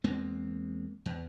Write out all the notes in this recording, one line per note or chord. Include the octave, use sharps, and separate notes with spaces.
E2 G#3 A#3 C4
E2